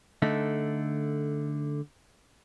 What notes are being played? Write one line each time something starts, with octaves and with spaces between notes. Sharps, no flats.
D3 A3 D#4